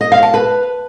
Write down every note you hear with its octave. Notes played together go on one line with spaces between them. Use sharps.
D#5
F5
A5
B4